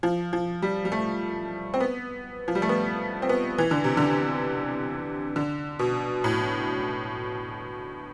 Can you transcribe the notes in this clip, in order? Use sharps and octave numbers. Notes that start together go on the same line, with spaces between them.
F3
F3
G3
G3
A3
C4
B3
F3
G3
A3
B3
C4
B3
E3
D3
C3
D3
D3
B2
A2